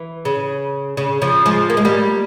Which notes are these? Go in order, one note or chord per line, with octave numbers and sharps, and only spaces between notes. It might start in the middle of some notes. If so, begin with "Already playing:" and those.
Already playing: E3
C#3
C#3
C#3 F3
F3 G#3
A#3
G#3
G3 A#3